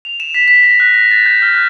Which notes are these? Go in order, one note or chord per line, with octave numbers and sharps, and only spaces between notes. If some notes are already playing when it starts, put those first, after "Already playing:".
F7
E7
B6
B6
A#6
F#6
A#6
A6
G6
F6
F#6